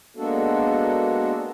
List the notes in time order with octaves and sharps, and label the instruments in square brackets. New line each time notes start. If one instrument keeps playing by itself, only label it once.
[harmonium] G#3 A#3 B3 D4 F#4 A4